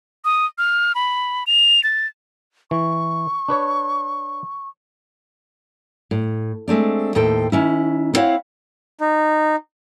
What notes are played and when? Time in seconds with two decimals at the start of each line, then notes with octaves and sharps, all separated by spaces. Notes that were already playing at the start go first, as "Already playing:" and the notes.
0.25 D#6
0.58 F6
0.95 B5
1.47 F7
1.84 A6
2.71 E3 C#6
3.49 D4 B4 C#5
6.11 A2
6.68 G#3 A3 C4 D4
7.15 D#2 A2 A4 C5 G5
7.52 D#3 C#4 E4
8.14 B3 C4 E4 C#5 F5 F#5
9.01 D#4